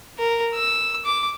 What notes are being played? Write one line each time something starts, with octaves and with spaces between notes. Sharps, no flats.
A#4
E6
D6